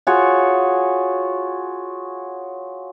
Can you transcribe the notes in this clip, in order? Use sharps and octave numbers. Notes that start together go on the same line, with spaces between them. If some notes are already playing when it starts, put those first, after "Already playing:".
F4 F#4 G#4 C#5